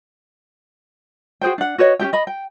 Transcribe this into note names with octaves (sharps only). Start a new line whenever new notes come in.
F#4 G#4 C5 G5
D4 F#5
F#4 B4 C#5 D#5
C#4 D4 G4 G5
D#5 B5
G5